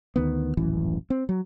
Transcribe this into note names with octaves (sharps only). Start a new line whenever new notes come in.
D2 D#3 B3
D#1 A1 F#2 E3
C4
F#3